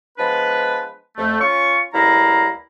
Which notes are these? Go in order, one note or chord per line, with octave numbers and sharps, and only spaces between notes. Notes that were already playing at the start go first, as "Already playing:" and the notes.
F3 G#3 B3 D4 B4
F2 A3
C#4 F4 C#6
C#2 G3 A#3 E4 F5 A#5